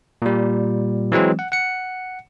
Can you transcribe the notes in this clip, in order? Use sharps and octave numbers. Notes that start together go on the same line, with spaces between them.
A#2 G3
E3 F#3 G#3 C4
F#5
F#5 C#7